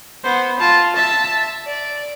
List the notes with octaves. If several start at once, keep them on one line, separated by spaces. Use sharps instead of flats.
B3 C5
F4 A5
E5 A5
D5